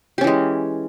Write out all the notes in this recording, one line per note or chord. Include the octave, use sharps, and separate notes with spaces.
E3 G#3 C#4 G4